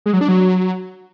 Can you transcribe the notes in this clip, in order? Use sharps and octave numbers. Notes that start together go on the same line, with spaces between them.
G#3
F#3
D4
F#3